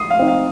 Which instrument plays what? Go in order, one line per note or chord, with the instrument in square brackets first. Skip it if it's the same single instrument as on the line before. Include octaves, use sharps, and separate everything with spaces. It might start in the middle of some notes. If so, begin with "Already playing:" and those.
Already playing: [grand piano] D#6 C7
F5
[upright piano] C4 D#4
[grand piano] F5